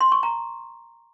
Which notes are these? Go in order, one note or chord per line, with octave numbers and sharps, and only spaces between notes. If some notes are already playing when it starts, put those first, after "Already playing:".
C6
C#6
A#5